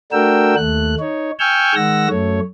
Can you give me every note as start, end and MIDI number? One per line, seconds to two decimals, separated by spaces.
0.12 0.55 57
0.12 0.55 62
0.12 0.55 66
0.12 0.55 70
0.12 0.55 79
0.12 0.55 88
0.56 0.95 39
0.56 0.95 57
0.56 0.95 90
1.00 1.31 63
1.00 1.31 73
1.39 1.75 79
1.39 1.75 80
1.39 1.75 85
1.39 1.75 88
1.39 1.75 89
1.39 1.75 91
1.75 2.08 51
1.75 2.08 56
1.75 2.08 78
1.75 2.08 88
1.75 2.08 94
2.09 2.40 42
2.09 2.40 57
2.09 2.40 73